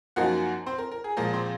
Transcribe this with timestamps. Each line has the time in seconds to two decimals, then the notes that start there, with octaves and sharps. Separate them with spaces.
0.16 F#2 F3 A#3 D#4 F#4 F#5
0.66 C4 C5
0.78 A#4
0.91 A#4
1.04 G#4
1.17 A#2 F3 G#3 A#4
1.33 C4 C5